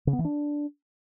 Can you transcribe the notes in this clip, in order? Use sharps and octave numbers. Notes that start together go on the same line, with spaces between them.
C#3
B3
E3
D4